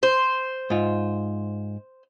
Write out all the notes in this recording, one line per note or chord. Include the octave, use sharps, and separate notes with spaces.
C5
G#2 F4